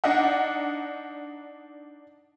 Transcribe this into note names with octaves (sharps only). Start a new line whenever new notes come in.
D4 D#4 D#5 F#5